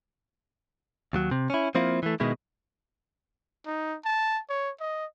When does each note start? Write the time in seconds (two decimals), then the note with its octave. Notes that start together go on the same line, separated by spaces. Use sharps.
1.13 D#2 F#3
1.31 C3
1.50 C#4 E4
1.75 F3 A#3 C4 E4 F4
2.03 E3 A3
2.20 B2 D#3 G#3 E4
3.66 D#4
4.05 A5
4.49 C#5
4.80 D#5